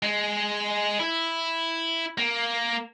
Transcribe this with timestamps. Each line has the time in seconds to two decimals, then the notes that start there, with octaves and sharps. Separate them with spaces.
0.02 G#3
1.00 E4
2.18 A#3